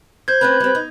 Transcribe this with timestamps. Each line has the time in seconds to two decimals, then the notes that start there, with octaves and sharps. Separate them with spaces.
0.28 C5 G6 G#6
0.41 A3 C4 C#4 B4
0.60 G3 C4
0.75 D#4